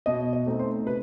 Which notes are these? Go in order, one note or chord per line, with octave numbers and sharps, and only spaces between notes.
B2 D#5
D#5
A3 C4 D#4
C5
C3 B4